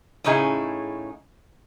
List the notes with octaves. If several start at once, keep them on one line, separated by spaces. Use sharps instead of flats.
A2 C#3 C#4 D#4 E4 G#4